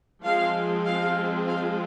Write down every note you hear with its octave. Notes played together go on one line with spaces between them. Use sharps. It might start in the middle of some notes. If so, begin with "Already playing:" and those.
F3 G#3 C4 F5
F5
F5